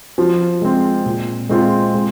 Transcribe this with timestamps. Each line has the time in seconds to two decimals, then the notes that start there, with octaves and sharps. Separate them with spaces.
0.18 F3
0.62 G#3 C4
1.06 A#2
1.49 G#3 C4 F4
1.95 G#3